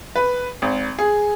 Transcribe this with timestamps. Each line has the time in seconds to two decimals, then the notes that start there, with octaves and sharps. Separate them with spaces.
0.16 B4
0.62 G#1
0.99 G#4